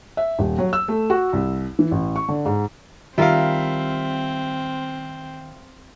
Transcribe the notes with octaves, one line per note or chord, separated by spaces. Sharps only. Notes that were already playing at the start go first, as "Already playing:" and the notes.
E5
D#1
F#3
E6
A3
F#4
C2
E3
A1
C#6
D3
G#2
D#3 G3 C4 F4 A#4 E5 F5